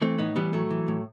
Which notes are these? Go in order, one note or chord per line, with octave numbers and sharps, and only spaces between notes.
E3 A3 C4
A2 B3 D#4
E3 G3 B3
A2 F#3 A3
E3
A2